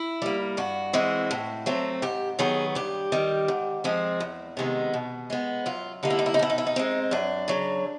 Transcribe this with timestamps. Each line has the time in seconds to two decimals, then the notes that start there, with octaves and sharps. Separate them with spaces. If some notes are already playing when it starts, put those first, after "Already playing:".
Already playing: E4
0.22 G3 A#3
0.57 G2 F#4
0.93 E3 G#3 C4
1.31 A2
1.66 F#3 A3 C4
2.02 G#2 G4
2.39 D#3 F#3 B3 G#4
2.75 G2 G4
3.12 D#3 G3
3.48 G#2
3.84 F3 G#3 C4
4.20 E2
4.57 C3 D#3 G#3 B3
4.94 B2
5.30 G#3 B3
5.66 F#2 F4
6.03 D3 G3 A#3 D#4
6.10 E4
6.19 D#4
6.26 E4
6.34 D#4
6.39 B2 E4
6.50 D#4
6.58 E4
6.67 D#4
6.76 G#3 C4
7.11 F#2 D4
7.48 C#3 F#3